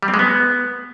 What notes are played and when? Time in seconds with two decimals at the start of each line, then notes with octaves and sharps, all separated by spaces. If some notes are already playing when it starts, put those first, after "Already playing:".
0.03 G3
0.08 C4
0.14 G#3
0.19 B3